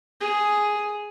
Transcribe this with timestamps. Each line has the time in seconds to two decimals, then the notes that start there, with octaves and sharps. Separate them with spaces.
0.21 G#4